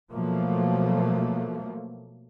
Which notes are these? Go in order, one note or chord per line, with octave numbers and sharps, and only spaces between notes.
B2 F3 F#3 A3 A#3